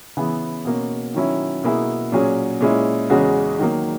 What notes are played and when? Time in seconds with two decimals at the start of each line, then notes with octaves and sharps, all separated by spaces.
0.17 C#3 E3 B3 E4 G#4
0.65 B2 A#3 C#4
1.14 D#3 F#3 C#4 E4
1.63 B2 A#3 E4 G#4
2.12 A#2 F#3 C#4 G#4
2.61 A#2 G#3 C#4 E4
3.10 E2 C#3 G#3 C#4 F#4
3.59 D#3 F#3 A#3